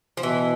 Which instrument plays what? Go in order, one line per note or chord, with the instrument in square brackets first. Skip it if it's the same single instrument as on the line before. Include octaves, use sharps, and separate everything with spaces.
[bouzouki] F3
[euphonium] B2 [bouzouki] E3